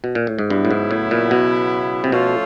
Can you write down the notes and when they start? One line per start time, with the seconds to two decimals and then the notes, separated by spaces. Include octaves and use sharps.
0.04 B2
0.15 A#2
0.27 A2
0.39 G#2
0.50 G2 C#3 F#3 B3 E4
0.65 A2
0.71 G#2
0.91 A2
1.11 A#2
1.31 B2
2.04 C3
2.12 B2 F3 A3 C#4 F4 A4